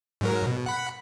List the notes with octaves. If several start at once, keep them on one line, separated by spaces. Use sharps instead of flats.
G#2 F#3 A#4
B2
F#5 B5